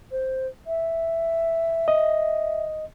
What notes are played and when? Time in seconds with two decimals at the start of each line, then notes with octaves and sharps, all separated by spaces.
0.12 C5
0.67 E5
1.88 D#5